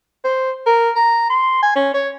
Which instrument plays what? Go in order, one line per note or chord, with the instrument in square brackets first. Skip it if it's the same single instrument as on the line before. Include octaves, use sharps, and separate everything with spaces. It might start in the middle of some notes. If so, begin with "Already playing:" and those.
[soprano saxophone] C5
A#4
A#5
C6
G#5
C#4
C#5